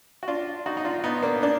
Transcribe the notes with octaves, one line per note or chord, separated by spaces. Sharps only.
F#4
D4 F4
D#4 F#4
D#4
D4 F4
B3 D#4
A#3 D4
A#3 D4